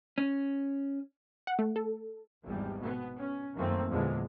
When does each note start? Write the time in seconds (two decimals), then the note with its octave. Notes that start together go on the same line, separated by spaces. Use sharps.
0.18 C#4
1.47 F#5
1.59 A3
1.76 A4
2.44 G#1 E2 G3
2.80 B2 B3
3.17 C#4
3.57 F#2 D#3 F3 A3 A#3 C4
3.90 E2 A#2 D3 F3 G#3